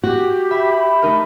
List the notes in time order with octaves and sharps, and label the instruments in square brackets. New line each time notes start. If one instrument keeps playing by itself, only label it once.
[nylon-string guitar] F#4 [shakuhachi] G4
[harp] E5 [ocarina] B5
[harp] A3 D#4 A#4